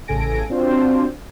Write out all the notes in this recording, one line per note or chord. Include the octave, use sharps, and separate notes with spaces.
A1 C#3 A4 G#5 A#6 D7
C4 D4 F4 F#4 C5